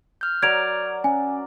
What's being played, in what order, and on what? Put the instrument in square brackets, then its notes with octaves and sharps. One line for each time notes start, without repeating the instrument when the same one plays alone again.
[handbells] F6 G6
[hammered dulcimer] F#3 A#4 D5 [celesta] G#6 D7 F7
[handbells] C#4 [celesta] G#5